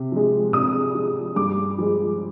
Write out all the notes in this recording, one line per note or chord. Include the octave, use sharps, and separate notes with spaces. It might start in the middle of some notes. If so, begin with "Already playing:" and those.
Already playing: C3
F3 G#3
C3 D#6
F3 G#3
G2 D6
F3 G#3